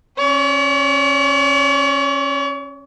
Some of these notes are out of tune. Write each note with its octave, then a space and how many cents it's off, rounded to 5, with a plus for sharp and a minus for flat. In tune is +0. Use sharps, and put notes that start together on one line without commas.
C#4 -25 C#5 +45